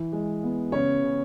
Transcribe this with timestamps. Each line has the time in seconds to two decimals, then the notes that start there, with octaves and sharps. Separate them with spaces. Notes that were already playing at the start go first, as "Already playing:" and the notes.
Already playing: E3
0.12 G#3
0.43 B3
0.72 C#3 C#4 C#5
1.03 C#3